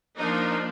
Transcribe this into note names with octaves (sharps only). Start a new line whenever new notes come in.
F3 A#3 D4 D#4